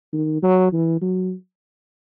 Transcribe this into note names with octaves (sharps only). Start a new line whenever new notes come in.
D#3
F#3
E3
F#3